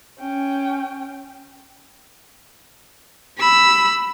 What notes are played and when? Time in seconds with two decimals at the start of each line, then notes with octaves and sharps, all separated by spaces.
0.20 C#4 G5
3.39 B5 E6